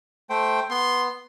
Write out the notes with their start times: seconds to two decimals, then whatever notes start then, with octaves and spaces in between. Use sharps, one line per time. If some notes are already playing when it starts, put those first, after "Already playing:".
0.30 A3 C5 G5
0.70 B3 C6